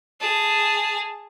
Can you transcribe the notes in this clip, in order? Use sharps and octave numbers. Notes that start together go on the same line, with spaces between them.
G#4 A5